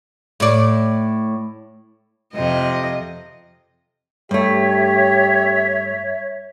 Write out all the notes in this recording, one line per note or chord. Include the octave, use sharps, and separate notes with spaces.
A2 D5
F2 C3 D#5
G2 A3 G4 C#5 E5